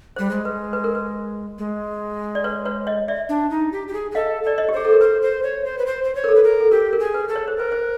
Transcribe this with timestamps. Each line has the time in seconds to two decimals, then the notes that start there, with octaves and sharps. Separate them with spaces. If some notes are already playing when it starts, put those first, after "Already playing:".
0.16 G3 C5
0.31 G#3
0.45 B4
0.73 B4
0.84 A#4
0.95 B4
1.58 G#3
2.35 D5
2.44 B4 C#5
2.65 B4 C#5
2.87 C#5 D#5
3.08 D5 E5
3.29 D4
3.50 D#4
3.72 G4
3.88 G4
3.93 G#4
4.11 G#4
4.15 A4 D#5 F5
4.43 A4 D5
4.58 C#5 D#5
4.69 G4
4.72 G#4 C5
4.85 A4
4.93 A#4
5.01 B4 C5
5.22 C5
5.43 C#5
5.64 C5
5.78 B4
5.86 C5
6.04 C5
6.15 C#5
6.24 A#4
6.29 A4
6.35 B4
6.44 A#4
6.60 A4
6.71 G4 A#4
6.93 A#4
7.00 G#4
7.14 B4
7.28 A4
7.36 C#5
7.48 C5
7.56 A#4 B4
7.72 C5